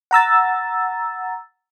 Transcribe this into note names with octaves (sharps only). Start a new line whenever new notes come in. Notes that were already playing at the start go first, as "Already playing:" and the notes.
F#5 A#5 E6 A6